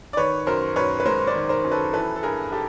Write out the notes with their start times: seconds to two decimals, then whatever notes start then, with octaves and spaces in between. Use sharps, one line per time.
0.13 D5
0.17 D#3 B4 C#5
0.46 F#2 A#4 C5
0.76 F#2 B4 C#5
1.00 B4
1.05 G#3 A#4 C5
1.27 C5 D5
1.35 D#3
1.49 A#4 C5
1.64 F#2
1.71 A4 B4
1.93 E3 A4 B4
2.16 A4
2.23 G2 G#4 A#4
2.52 G4 A4